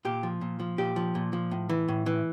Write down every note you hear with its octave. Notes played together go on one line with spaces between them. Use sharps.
A#2 G4
F3
A#2
F3
A#2 G4
F3
A#2
F3
A2
E3
A2
E3